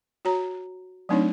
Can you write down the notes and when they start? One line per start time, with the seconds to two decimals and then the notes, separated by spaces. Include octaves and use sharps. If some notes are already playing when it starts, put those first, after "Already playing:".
0.25 F#4 C#5 A#5
1.09 F#3 A3 C4 D4 D#4 C#5